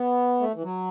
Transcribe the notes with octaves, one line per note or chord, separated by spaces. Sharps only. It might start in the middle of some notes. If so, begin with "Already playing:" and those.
Already playing: B3
A3
E3
F#3